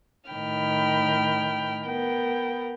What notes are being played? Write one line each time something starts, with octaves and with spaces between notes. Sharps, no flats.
A2 D#3 G5 B5 F6
B3 A#4 G5